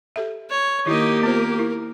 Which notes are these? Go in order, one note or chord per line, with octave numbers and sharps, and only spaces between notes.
G4 A4 E5
C#5
D#3 A#3 D#4 E4 G4 D#5
B3 F4 A#4 C5
E4